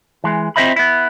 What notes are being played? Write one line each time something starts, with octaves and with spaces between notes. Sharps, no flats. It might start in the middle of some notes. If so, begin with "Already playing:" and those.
E3 G#3
C4 F4 C5 D#5 E5 B5
B3 E4